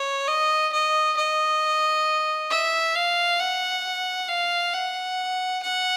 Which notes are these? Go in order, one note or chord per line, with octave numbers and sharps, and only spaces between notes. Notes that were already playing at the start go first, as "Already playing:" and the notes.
Already playing: C#5
D#5
D#5
D#5
E5
F5
F#5
F5
F#5
F#5